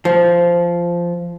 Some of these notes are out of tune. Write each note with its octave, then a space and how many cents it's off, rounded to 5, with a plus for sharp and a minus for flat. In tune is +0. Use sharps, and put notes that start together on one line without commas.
F3 -10